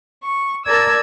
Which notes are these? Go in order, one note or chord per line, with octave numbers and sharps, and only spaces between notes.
C#6
A#4 D5 A5 E6 G#6